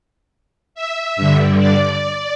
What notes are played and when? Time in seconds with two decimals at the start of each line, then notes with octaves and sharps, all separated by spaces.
0.75 E5
1.16 G2 D3
1.58 D5